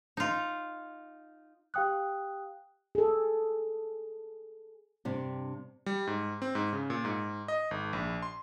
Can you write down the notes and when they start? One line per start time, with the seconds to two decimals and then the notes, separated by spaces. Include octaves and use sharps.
0.17 D#4 F4
1.74 G4 F5 G5 D#6 F#6
2.95 G#4 A4
5.05 G2 C3 D4
5.86 G3
6.07 G#2
6.42 C4
6.55 G#2
6.73 C#3
6.90 A#2
7.05 G#2
7.48 D#5
7.71 G#1
7.93 A#1
8.22 C6